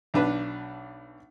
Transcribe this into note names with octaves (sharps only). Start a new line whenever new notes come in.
B1 D4 B4